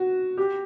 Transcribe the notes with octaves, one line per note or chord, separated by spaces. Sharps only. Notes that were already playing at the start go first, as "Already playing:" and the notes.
Already playing: F#4
G4